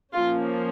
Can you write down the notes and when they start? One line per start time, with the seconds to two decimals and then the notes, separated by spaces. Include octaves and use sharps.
0.13 F3 A#3 C#4 F4